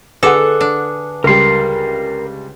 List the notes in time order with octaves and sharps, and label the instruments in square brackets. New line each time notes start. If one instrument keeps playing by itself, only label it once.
[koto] D3 A4 [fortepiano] G#4 F#5 [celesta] B4 D6
[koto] D4
[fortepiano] C#2 G3 [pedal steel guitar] A#4 C6